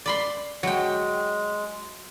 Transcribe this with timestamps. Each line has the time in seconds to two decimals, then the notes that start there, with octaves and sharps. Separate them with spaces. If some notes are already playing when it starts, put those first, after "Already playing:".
0.06 D5 B5 C6
0.63 F#3 G#3 G5